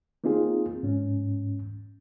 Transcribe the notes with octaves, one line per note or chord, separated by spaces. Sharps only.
A#3 C4 D#4 F4 G#4
G#2 C#4